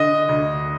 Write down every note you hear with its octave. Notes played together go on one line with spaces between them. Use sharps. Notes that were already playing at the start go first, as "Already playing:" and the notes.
Already playing: D3 D#5
D2